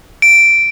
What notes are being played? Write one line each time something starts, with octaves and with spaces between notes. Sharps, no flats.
D7